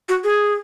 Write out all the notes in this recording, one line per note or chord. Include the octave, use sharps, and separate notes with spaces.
F#4
G#4